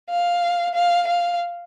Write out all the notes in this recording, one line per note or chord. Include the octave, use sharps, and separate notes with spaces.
F5
F5
F5